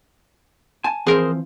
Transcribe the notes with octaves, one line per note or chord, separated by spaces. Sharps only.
G#5 A5
E3 F3 C4 G#4 A#4 C5